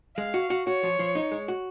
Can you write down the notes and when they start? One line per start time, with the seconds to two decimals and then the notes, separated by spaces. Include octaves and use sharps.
0.17 G#3 F5
0.34 F#4
0.50 F#4
0.67 F#4 C#5
0.83 F3
0.99 F3
1.15 D#4
1.32 G#3
1.48 F#4